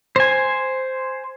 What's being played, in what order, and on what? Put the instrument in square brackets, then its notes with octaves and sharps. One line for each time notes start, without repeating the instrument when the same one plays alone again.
[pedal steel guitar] C5 G#5